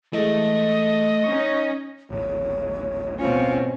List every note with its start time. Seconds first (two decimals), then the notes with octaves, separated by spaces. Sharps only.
0.13 E3 G#3 A3 D#5
1.24 C#4 D#4 C#6
2.10 D1 G#1 C#5
3.18 B2 C4 C#4 F4